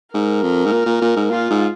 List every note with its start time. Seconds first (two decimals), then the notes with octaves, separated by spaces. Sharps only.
0.14 G#2 A#4
0.43 F2
0.65 G#2
0.72 A#2
0.86 A#2
1.02 A#2
1.16 G#2
1.30 A#2 F4
1.50 G#2